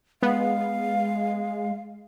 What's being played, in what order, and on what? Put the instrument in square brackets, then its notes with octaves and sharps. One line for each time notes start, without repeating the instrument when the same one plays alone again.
[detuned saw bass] G#3 [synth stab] B3 [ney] F5